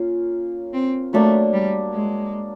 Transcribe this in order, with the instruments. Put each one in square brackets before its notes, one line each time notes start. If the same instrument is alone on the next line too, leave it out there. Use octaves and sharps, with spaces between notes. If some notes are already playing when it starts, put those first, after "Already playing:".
Already playing: [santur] A#3 C#4 F4
[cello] C4
[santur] F#3 A#3 D4 [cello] A3
[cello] G3
G#3